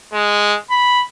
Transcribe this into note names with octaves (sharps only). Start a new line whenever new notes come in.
G#3
B5